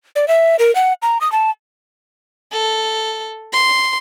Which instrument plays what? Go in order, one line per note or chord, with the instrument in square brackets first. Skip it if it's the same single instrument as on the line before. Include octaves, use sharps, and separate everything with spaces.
[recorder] D5
E5
A#4
F#5
A#5
D#6
A5
[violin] A4
C6